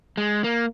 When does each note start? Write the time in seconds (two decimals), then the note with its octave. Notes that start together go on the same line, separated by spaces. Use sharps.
0.17 G#3
0.44 A#3